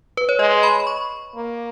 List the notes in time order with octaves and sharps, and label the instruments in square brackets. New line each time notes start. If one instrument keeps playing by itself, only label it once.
[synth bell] B4
C#5
[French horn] G#3 [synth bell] D#5
[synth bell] B5
B5
C#6
[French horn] A#3